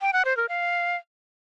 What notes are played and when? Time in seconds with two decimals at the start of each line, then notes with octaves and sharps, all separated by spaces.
0.01 G5
0.13 F#5
0.25 C5
0.37 A#4
0.49 F5